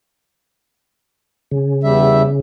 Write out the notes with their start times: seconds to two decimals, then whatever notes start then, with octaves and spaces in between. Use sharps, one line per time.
1.51 C#3
1.84 E2 G3 E5